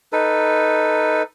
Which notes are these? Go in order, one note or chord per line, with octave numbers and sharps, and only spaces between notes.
D#4 A4 B4